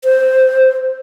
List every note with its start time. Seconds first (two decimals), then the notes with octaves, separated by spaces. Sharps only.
0.04 C5